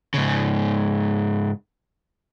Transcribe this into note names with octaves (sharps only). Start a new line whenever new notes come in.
G#2 C#3